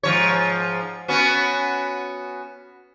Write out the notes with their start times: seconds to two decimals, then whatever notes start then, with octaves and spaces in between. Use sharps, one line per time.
0.03 G#2 F3 C#5
1.08 B3 C#4 F#4